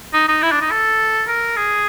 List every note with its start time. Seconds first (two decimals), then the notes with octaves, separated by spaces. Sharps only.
0.13 D#4
0.28 D#4
0.43 E4
0.52 D4
0.61 D#4
0.71 A4
1.28 A#4
1.57 G#4